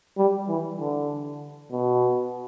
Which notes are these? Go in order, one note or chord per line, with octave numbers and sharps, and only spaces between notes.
G3
E3
D3
B2